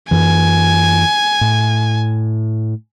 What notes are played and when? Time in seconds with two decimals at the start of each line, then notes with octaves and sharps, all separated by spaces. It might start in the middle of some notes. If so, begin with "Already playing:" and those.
0.11 F#2 E3 G#5
1.41 A2